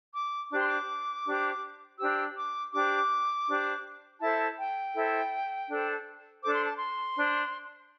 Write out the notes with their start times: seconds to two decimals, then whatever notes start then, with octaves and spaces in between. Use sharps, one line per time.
0.14 D6
0.52 D4 G4 C5 D6
0.60 C6
0.68 D6
1.25 D4 G4 C5
1.99 D4 G4 C5 E6
2.36 D6
2.73 D4 G4 C5 D6
3.48 D4 G4 C5
4.21 E4 A4 C5 A5
4.58 G5
4.95 E4 A4 C5
5.69 D4 A4 C5
6.43 D4 A4 C5 D6
6.54 C6
6.65 A5
6.77 C6
7.17 D4 C5